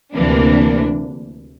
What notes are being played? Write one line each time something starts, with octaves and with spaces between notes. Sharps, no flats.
D2 C3 E3 A#3 D4